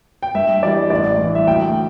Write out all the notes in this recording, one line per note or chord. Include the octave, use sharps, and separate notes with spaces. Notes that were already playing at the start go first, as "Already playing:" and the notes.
G5
G2 E5
E3 G3 D5
A1 D5
G2 E3
E5
D2 G5